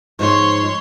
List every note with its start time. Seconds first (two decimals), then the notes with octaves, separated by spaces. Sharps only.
0.19 G#2 F3 G#3 C#5 C6